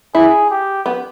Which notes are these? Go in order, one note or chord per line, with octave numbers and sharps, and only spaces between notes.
E4 G#4
G4
B3